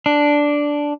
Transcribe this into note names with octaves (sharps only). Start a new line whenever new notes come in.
D4